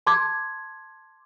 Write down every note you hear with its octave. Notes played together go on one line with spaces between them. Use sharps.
A5 C6 D6 G#6